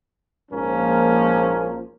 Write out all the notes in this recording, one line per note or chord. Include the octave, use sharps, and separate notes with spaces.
A#1 G#2 F3 A#3 C#4 A#4